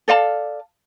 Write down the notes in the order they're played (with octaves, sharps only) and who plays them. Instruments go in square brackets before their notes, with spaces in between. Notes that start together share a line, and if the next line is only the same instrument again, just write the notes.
[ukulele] A4 D5 F5 A5